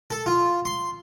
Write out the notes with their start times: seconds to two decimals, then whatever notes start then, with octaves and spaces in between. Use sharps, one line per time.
0.10 A4
0.26 F4
0.65 C6